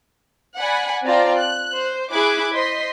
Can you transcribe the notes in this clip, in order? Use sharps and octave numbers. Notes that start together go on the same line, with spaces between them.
D5 F#5 G#5 B5
C4 F4 D5 A5 A#5
F#6
C5
E4 G#4 B5 D6 F#6 G#6
C5 D#5 C6 B6